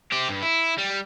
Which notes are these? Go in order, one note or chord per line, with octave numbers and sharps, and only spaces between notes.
C4 G4
G2
E4
G3